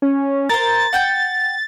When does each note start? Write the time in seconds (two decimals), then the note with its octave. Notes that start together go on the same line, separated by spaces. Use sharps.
0.02 C#4
0.49 A#4 C5 A6
0.93 F#5 G5 G6